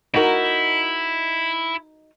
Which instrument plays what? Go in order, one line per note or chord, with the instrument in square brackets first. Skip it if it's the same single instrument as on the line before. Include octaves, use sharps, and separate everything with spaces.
[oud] D#4 F#4 A#4 [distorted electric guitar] E4